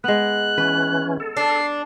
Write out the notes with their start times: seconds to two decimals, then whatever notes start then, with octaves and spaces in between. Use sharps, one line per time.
0.04 G#3 B3 F#6
0.58 E3 C#4 B4
1.20 A4
1.37 D4 C7